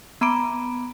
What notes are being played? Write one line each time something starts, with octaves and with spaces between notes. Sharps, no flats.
B3 A#5 B5 D6 D7